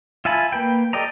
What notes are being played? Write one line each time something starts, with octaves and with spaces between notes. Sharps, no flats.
F4 E5 G#5 A5 B5
A#3 B4 G5
G4 A4 D5 D#5 A#5